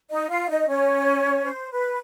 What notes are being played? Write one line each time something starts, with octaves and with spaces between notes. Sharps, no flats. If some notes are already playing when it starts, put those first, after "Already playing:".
D#4 D#5
F4 F5
D#4 D#5
C#4 C#5
C5
B4